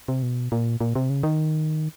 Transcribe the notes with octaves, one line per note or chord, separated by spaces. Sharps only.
C3
B2
A#2
A#2
C3
C#3
D#3